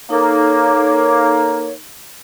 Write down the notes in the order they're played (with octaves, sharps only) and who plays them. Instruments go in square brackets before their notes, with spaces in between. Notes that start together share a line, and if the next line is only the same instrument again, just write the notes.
[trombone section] A#3 [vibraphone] D#4 A4 [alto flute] C#5